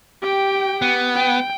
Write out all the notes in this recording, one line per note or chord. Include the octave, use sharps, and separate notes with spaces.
G4 G5
B3
G5